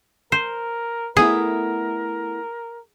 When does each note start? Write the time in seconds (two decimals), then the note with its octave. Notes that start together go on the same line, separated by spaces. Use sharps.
0.32 A#4 C5
1.17 A3 B3 E4 G#4 A#4